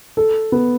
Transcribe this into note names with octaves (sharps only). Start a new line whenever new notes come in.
A4
B3